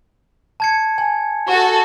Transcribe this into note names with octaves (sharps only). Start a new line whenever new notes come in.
A5 G#6 C#7
G#5
F#4 A4 C#6